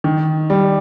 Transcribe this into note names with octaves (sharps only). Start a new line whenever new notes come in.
D#3
G3